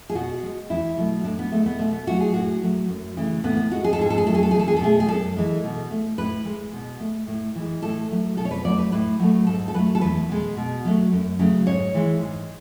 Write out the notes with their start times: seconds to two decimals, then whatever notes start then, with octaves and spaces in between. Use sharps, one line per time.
0.10 G#4
0.15 B2 F#4
0.43 G#3
0.70 E2 E4
0.97 B2 F#3 A3
1.24 A2 D4
1.39 B3
1.52 G#3 A3
1.66 B3
1.79 B2 A3
1.93 B3
2.07 F#3 A3 F#4
2.20 G#4
2.33 A2 F#4
2.62 F#3 A3
2.89 F#2
3.17 C#3 E3 A3
3.44 A2 B3
3.57 B3
3.71 G#3 F#4
3.84 G#4
3.93 A4
3.98 G#2 G#4
4.10 A4
4.18 G#4
4.26 F#3 A3 A4
4.35 G#4
4.43 A4
4.51 E2 G#4
4.59 A4
4.68 G#4
4.77 A4
4.80 B2 A3 G#4
5.00 G#4
5.08 F#2 A4
5.36 E3 G#3
5.64 B2
5.91 A3
6.18 A2 B4
6.45 G#3
6.73 B2
7.00 A3
7.27 A2
7.55 E3 G#3
7.82 A2 A4
8.10 F#3 A3
8.37 B2 A4
8.45 C#5
8.51 B4
8.65 F#3 A3 D5
8.79 B4
8.92 A2 B4
9.20 F#3 A3
9.47 G#2 A4
9.68 A4
9.74 F#3 A3 B4
9.95 A4
10.01 E2 B4
10.29 B2 G#3
10.57 B2
10.85 F#3 A3
11.12 F#2
11.39 C#3 F#3 A3
11.66 G#2 C#5
11.94 E3 G#3
12.21 G#2